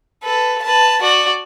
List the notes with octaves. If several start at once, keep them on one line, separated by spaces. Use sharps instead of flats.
A4 B4
B4 A5
F#4 D5